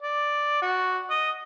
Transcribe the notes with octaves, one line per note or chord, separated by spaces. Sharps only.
D5
F#4
D#5